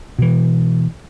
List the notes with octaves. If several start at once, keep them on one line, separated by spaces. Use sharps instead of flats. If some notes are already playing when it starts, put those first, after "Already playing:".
B2 E3